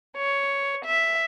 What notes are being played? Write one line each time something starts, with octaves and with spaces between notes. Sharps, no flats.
C#5
E5